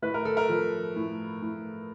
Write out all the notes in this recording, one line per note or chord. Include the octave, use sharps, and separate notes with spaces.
A2 B4
A#4
A4
A#4
F3
A2
A2